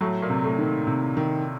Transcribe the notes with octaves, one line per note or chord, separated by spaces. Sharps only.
A2 F#3 A3
A#2 A#3
C3
A2 A3
D#3
C3
D#3